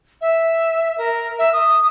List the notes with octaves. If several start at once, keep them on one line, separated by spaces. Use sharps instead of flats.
E5
A#4
E5
D#6